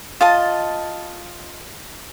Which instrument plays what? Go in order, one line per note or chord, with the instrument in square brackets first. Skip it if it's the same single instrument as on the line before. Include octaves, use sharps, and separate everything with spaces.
[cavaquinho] F4 D#5 A5